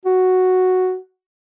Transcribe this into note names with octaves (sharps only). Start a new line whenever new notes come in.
F#4